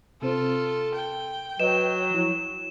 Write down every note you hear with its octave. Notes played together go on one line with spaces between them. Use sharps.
C3 C4 F4 A4 C5
G5
F#3 B4 D#5 E7
F3 E4